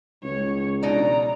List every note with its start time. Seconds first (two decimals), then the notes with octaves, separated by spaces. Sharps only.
0.24 C#2 C#5
0.83 B2 D4 D#4 D5 A#5